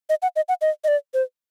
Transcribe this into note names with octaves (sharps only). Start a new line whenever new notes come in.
D#5
F#5
D#5
F#5
D#5
D#5
D5
C5